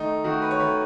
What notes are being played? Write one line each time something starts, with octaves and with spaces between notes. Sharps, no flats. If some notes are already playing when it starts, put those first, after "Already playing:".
Already playing: D#3 A3 D#4
D#3 A3 F#4
B4
C#5
D#3 A3 B4